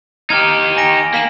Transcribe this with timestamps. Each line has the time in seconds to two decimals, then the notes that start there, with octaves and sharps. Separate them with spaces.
0.30 D#4 G4 A#5 F6 G#6
0.77 G#5 A#6 D7
1.14 A#3 B6 E7 F#7